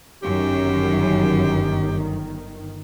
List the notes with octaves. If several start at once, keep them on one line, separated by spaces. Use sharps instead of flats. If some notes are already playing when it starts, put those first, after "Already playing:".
G1 F#2 D#3 G4